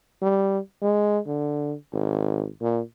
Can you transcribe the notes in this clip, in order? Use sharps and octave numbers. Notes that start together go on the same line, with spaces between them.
G3
G#3
D3
G#1
A#2